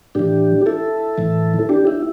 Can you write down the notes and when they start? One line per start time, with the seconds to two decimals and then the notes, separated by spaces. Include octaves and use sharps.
0.15 A2 E3 D4 G4
0.66 E4 A4
1.18 A2 E3
1.69 D4 G4
1.87 E4